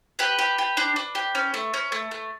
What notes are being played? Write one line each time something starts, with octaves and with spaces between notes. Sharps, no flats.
G4 B4
G4
G4
D4
D4
G4
C#4
A3
C#4
A3
A3